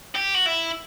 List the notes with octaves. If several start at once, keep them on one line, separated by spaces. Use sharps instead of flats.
G4
F#4
E4